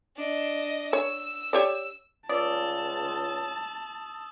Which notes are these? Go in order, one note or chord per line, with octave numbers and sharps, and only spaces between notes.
D4 D#5
C#5 E6
G4 C#5 D5
C#2 D5 A5 D#6 E6